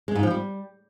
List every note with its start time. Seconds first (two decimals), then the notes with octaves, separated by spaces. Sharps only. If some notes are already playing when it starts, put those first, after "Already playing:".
0.08 G#3
0.15 G#2
0.23 F3
0.31 G3